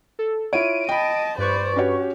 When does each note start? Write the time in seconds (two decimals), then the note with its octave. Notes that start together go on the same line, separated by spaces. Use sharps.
0.19 A4
0.53 E4 F4 C#5 D7 D#7
0.89 D#5 G5 A5 B5
1.38 G2 B4 C5 D5 C#6
1.76 C#4 F#4 G4 C#5